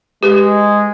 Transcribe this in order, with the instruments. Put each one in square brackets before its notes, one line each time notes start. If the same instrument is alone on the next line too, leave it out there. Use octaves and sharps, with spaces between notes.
[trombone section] G#3 [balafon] G4 B4